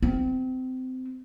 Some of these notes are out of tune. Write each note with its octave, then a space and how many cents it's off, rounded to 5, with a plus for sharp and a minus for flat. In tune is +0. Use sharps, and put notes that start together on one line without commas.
C4 -25